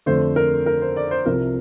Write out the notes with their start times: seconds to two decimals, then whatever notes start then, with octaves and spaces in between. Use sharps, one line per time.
0.06 F2 D3 A3 C5
0.36 A#4
0.66 A#4
0.81 C5
0.97 D5
1.11 C5
1.26 C2 C3 F3 A#4